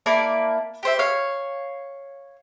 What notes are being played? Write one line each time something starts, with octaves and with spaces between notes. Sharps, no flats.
A#3 E4 D5 A5
G4 C5 E5
C#5 F5